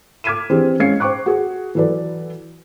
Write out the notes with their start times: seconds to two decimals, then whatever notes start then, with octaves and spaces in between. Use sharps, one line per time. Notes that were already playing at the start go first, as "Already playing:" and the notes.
0.24 D6 F6 G#6 B6 D#7 E7
0.50 E3 C4 D4 G4 G#4
0.80 G#3 C#4 F5 G#6 C7 C#7
1.00 C5 G5 C#6 D6 F#6
1.26 F#4 G#4
1.75 E3 F#3 A4 B4 D5